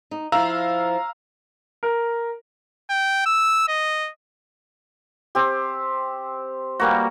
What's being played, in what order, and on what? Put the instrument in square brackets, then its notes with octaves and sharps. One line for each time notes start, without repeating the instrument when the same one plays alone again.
[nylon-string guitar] D#4
[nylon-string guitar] F3 E4 [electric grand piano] F5 A#5 E6
[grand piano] A#4
[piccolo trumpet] G5
E6
D#5
[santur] C4 G4
[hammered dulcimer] G3 A#3 F#4